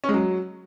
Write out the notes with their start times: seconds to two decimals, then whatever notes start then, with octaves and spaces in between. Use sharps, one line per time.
0.04 C#4
0.09 G#3
0.14 F#3